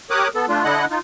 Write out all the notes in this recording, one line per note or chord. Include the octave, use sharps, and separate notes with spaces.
G4 A#4 C#5 D6 D#6 F#6
B3 A4
A3 D4 F4
D3 D4 E4 D#5 F#5 F#6
D#4 F4